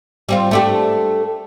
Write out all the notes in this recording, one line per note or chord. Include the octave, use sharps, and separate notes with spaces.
G3 C4 F4
A3 D4 G4